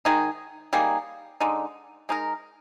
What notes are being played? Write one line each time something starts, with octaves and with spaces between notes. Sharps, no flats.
D#3 G#3 D#4 G#4
G3 A#3 D#4 G#4
D3 G#3 D#4
G#3 D#4 A#4